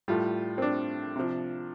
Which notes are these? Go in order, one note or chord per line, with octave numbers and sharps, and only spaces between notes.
A2 G3 F4
C4
D4
C3 F3